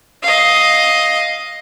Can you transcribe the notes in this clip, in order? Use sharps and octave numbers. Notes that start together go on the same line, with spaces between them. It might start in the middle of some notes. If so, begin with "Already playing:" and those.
D#5 F5